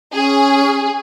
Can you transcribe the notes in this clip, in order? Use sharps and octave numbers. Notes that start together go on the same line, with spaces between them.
C#4 G#4